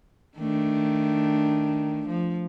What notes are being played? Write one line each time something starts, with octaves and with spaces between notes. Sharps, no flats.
D#3 A3 D4
F3